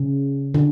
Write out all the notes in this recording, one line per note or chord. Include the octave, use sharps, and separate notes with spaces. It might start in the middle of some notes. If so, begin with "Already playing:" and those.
Already playing: C#3
D3